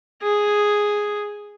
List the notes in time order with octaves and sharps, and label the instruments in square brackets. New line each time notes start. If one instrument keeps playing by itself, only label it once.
[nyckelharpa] G#4